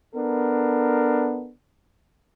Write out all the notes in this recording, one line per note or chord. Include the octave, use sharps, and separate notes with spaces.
B3 D4 A4 A#4